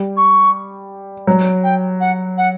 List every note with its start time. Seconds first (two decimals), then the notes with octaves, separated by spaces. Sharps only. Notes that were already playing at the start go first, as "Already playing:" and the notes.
Already playing: G3
0.17 C#6
1.27 F#3
1.63 G5
2.00 F#5
2.38 F#5